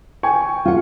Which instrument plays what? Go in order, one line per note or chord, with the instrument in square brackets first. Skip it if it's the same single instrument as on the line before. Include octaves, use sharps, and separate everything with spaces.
[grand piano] G5 G#5 C#6
[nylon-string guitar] F4 F#5